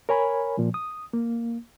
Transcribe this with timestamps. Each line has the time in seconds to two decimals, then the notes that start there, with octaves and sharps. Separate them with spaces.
0.09 A#4 C#5 G#5 B5
0.57 A#2 F3
0.74 D#6
1.13 A#3